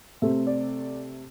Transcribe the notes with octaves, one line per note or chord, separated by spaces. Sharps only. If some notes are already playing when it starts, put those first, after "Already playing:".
C3 A3 C4 E5
D5